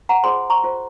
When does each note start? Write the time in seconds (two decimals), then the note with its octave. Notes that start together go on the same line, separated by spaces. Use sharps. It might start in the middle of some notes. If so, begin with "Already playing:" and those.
0.09 F#5 A#5
0.23 F4 G#4 C5 G#5 C6
0.50 A#5 C#6
0.64 F4 C5